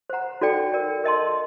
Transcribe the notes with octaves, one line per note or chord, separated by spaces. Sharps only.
C5 F#5 A#5
D#4 F#4 A4 D5 G5
A#4 D5 G5
A#4 D#5 A5 C6